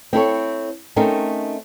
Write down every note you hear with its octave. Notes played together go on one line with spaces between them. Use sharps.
C4 E4 A4 C#5
A3 C4 C#4 D#4 A#4